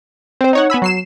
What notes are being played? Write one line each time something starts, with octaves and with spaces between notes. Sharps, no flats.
C4 C5
D#4 C#5 F#5
B3 G#5 B5 E6
F#3 C7 E7